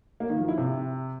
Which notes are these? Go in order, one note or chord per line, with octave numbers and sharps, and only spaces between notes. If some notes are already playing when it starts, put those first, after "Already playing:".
A#3
D#3
F3
E4
C3